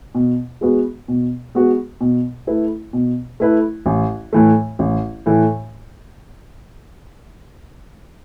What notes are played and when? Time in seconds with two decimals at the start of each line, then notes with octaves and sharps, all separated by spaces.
0.15 B2
0.61 G#3 B3 F#4 B4
1.08 B2
1.55 G#3 B3 F#4 B4
2.01 B2
2.47 A3 E4 B4
2.93 B2
3.40 A3 E4 B4
3.86 A1
4.33 A2 E3 A3
4.79 A1
5.26 A2 E3 A3